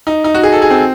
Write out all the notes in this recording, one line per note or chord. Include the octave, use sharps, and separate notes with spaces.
D#4
D#4
F#4
G#4
A4
G#4
C4